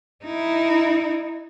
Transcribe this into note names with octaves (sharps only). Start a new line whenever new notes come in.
D#4 E4